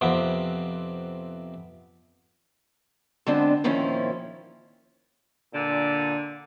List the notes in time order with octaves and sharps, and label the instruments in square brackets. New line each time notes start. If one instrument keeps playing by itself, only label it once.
[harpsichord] F2 C3 B3
[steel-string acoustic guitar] D3 G#3 B3 C4 D4
A#2 D#3 F3 C4 C#4 E4
[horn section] A#2 D3